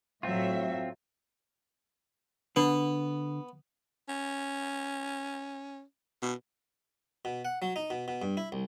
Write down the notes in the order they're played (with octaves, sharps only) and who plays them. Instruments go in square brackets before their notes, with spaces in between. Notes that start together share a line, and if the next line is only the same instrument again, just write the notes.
[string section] A2 F#3 E5 [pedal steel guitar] C4 F4
[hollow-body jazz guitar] D3 [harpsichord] B3
[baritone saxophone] C#4
B2
[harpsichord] B2
F#5
F#3
D#4
B2
B2
G2
E4
C2